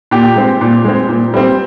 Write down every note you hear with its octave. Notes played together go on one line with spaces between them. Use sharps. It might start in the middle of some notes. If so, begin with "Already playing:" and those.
A#2 G4
G#3 C4
A#2
G#3 C4
A#2
G3 C4